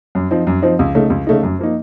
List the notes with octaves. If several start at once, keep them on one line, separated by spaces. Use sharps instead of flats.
F#2
F3 C4 D#4
F#2
F3 C4 D#4
C#2
C#3 A3 D#4
C#2
C#3 A3 D#4
F#2
F3 A#3 D#4